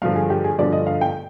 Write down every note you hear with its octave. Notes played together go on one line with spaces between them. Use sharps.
G2 D3 F3 F5
G#4
G4
G#4
G2 D3 F3 D5
D#5
F5
G5